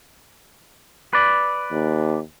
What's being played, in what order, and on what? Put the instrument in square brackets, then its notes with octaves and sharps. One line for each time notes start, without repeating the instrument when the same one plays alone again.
[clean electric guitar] B4 D5
[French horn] D#2